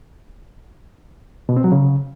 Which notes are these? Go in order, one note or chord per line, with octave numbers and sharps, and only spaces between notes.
B2
C4
F#3
C#3